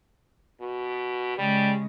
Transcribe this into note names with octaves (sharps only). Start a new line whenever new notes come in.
B2
C#3 G3 G#3